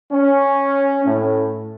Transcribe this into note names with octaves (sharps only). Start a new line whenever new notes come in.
C#4
A2